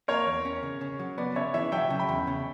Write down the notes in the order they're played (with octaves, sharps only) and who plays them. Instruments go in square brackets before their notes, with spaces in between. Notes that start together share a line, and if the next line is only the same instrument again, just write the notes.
[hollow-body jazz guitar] A#3 [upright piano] A#4 C#5
[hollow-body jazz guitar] E2
C#4
C#3
C#3
F#3
[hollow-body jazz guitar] B3 [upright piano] B4 D5
[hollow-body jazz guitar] C#3 [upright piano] C#5 E5
[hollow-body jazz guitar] E3 [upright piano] C#5 E5
[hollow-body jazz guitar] F#3 [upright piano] E5 G5
[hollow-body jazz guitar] C#3
[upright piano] G5 B5
[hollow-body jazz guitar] E2
C#3